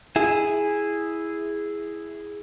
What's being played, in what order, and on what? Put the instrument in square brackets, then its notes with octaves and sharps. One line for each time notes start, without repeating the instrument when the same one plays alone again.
[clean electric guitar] E4 G#4